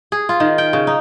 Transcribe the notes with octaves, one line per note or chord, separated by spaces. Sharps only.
G#4
F4
D#3
G5
C#3
D#4